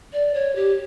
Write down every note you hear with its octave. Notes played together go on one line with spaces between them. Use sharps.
D5
C#5
G4